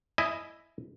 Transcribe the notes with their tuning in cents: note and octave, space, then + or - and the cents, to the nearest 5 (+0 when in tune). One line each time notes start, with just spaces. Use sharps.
E4 +0 D#5 +0 G#5 +30